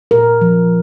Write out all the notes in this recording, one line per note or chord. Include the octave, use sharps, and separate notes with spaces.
A#2 A#4
F3